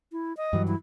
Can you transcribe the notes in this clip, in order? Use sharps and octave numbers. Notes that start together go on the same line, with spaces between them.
E4
D#5
G2 E3 F#3
E4